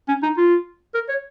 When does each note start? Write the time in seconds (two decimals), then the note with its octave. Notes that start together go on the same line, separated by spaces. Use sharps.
0.08 C#4
0.23 D#4
0.37 F4
0.94 A#4
1.09 C#5